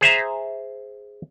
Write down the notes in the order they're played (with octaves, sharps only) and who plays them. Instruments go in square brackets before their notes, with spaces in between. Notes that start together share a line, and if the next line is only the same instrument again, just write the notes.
[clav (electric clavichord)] G#4 C5 E5 A#5